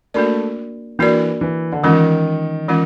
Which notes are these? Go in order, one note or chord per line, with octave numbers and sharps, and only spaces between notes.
A3 A#3 D4 F#4 A#4 D5
E3 A#3 D4 F#4 A#4 D5
E3
D3
D#3 E3 G#3 C#4 F4 A#4
E3 G#3 C#4 F4 A#4